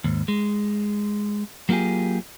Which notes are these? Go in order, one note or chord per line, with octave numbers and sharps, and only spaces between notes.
D#2 G#2
G#3
F#3 A#3 F4 G4 G#4